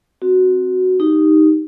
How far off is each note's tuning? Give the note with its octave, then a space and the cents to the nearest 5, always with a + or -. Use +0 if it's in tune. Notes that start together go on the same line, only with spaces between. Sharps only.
C4 -5 F#4 +0
D#4 +0 G4 +0